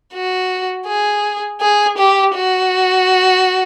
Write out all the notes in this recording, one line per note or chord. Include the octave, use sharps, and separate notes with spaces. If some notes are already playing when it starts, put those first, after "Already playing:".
F#4
G#4
G#4
G4
F#4